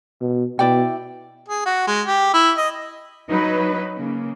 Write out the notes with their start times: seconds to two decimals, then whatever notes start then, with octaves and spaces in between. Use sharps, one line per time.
0.21 B2
0.59 B2 E4 D5 G5
1.48 G#4
1.66 F#4
1.87 G#3
2.06 G4
2.34 E4
2.57 D#5
3.29 F#3 D#4 B4
3.96 C#3 A#3